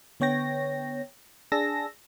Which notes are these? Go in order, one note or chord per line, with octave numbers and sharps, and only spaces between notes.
D3 B3 C#5 G5 A#6
D4 G#4 A5 E6 A#6